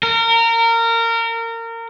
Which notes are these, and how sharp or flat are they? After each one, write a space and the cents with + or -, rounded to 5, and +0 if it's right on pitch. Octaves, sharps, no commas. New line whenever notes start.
A#4 -25